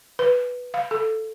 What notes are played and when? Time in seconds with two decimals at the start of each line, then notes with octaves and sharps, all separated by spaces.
0.19 B4
0.74 F5
0.91 A4